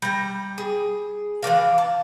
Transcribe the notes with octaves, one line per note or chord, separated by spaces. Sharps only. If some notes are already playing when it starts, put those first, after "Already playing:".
G3 A#5
G#4
E3 A#3 D4 F5
A5